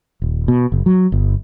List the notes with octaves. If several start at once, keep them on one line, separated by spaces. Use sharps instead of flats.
D#1
B2
F#1
F#3
G1